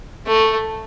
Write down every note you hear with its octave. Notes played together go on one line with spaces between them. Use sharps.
A3